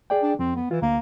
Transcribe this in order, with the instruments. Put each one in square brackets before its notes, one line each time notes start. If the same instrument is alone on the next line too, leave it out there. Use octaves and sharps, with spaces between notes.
[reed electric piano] G#4 D5 G5
[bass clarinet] D4
[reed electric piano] F2 [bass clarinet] C4
[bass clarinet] B3
[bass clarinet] E3 [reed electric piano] F4
[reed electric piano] D2 [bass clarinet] A#3